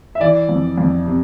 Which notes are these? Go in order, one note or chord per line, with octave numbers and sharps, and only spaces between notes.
E5
E3 D5
F2
F2
C3